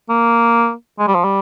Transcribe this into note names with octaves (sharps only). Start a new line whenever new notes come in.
A#3
G#3
G3
F3
G3